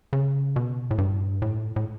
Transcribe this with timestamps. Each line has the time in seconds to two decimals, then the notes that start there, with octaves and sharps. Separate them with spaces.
0.13 C#3
0.56 B2
0.91 A2
0.98 G2
1.42 A2
1.76 A2